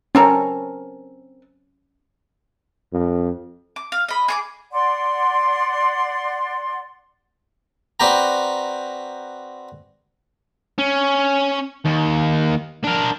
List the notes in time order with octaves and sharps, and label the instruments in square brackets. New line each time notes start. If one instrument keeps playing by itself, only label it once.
[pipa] C4 A4 A#4 [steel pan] C#4
[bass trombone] F2
[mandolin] D6
F5
D#5 B5
G#4 C#6 D6
[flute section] D5 F#5 C6
[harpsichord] C4 F#4 B4 D5 G5 A#5
[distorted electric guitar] C#4
D#2
D4 A#4